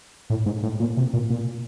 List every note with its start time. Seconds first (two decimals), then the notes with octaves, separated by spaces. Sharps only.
0.30 A2
0.46 G#2
0.63 A2
0.80 A#2
0.97 C3
1.13 A#2
1.30 A#2